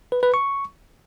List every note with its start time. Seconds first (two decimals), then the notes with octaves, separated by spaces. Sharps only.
0.12 B4
0.23 B4
0.34 C#6